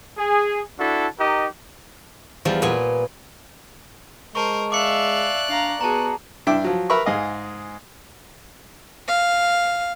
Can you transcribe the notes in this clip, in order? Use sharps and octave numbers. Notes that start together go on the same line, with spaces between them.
G#4
D4 E4 F#4 A4
D#4 G4 A#4 D#5
E2 F3 G3
A#2 B3 G#5
G#3 A#4 C5 A5 C#6
D5 E5 F5 D6 F#6 C#7
D4 F5 A#5
B3 F#4 G#4 A5 A#5
G2 D4 E4 E5 G5 D6
F3 F#3
A#4 B4 E5 B5 C#6
G#2 G#4 D#5 F5
F5